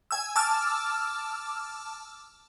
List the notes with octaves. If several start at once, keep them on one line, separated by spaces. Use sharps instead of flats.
G#5 E6
A5 D6 E6 F6